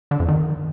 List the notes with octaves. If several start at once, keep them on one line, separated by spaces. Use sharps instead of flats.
D3
F2
D#3